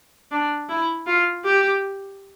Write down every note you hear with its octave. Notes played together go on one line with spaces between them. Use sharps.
D4
E4
F4
G4